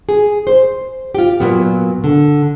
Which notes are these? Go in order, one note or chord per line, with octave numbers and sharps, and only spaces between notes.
G#4
C5
F4 G4
A#2 F#3 B3
D3